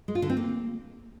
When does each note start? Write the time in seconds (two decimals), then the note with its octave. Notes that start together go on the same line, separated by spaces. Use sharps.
0.08 G#3
0.15 F4
0.22 D3
0.29 C4
0.37 A#3